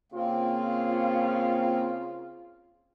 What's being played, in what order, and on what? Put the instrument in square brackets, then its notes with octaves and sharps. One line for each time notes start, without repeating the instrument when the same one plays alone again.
[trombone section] C#3 F4 [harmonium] A#3 C4